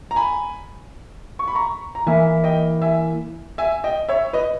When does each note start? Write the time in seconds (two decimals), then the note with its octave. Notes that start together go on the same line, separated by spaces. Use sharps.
0.11 A#5
0.16 G#5 B5
1.39 C#6
1.48 B5
1.55 A#5 C#6
1.95 A#5
2.07 E3 A#3 E4 E5 G#5
2.44 D#5 G5
2.82 E5 G#5
3.58 E5 G#5
3.84 D#5 G5
4.09 C#5 E5
4.33 B4 D#5